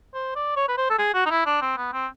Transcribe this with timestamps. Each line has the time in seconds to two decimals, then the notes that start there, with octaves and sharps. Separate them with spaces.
0.14 C5
0.35 D5
0.56 C#5
0.68 B4
0.77 C5
0.90 A4
0.98 G#4
1.14 F#4
1.26 D#4
1.30 E4
1.46 D4
1.62 C4
1.77 B3
1.93 C4